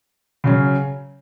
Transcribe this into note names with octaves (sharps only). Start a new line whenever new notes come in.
C#3 F#3 C#4